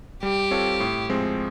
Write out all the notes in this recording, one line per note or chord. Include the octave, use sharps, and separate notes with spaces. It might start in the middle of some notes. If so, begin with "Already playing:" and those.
G3 G4
C4 F4 A4 C#5
A2
F3 G#3 C4